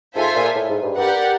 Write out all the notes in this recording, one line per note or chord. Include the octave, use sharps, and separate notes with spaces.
G#2 F4 A4 C5 E5 G#5
A#2
A2
G#2
G2
G2 G4 A#4 D5 F#5